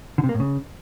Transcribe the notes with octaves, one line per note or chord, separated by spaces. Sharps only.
D3
C3
A#3
A2
C#3